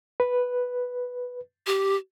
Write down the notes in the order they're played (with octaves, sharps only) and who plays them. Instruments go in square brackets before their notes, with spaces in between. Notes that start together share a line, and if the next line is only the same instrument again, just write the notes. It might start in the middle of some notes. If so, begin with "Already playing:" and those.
[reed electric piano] B4
[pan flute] G4